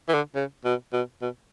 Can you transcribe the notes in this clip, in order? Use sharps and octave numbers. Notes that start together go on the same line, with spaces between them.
E3
D3
C#3
B2
B2
B2